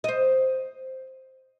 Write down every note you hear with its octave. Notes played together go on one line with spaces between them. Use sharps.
C5 D#5